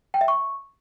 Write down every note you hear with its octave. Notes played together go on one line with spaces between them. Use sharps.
G5
E5
C#6